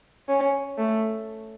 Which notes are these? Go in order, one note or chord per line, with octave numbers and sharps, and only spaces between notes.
C#4
A3